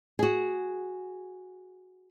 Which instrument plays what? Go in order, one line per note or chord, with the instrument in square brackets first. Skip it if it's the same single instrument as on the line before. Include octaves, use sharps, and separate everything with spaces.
[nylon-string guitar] F#4 G#4